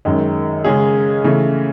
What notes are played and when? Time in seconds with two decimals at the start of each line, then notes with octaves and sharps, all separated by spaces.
0.05 F#2 D#3 G#3
0.64 C#3 G#3 C#4 G#4
1.24 C#3 E3 A3 C#4